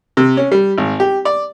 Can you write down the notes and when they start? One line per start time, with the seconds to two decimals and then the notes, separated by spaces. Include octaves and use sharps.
0.17 C3
0.37 C#4
0.52 G3
0.78 G#1
1.00 G4
1.25 D5